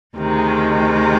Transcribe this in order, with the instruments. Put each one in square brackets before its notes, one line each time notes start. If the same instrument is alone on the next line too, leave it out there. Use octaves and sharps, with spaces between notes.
[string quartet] D2 C3 D#3 G#3